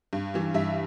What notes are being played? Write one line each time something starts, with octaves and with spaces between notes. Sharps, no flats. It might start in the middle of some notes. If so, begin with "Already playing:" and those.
G2
E3 G3
G2 E5